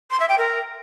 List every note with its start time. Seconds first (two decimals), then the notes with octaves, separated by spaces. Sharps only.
0.10 C6
0.19 E5
0.29 G5
0.38 A#4